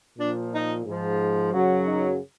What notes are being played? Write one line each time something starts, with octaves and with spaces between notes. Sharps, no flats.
A#2 F3 D4
D#4
G#2 F3
F#2 C#3 F#3
D#4